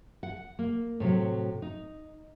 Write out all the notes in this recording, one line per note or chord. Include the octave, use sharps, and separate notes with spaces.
F#5
A#3
A2 C3 F#3
D#4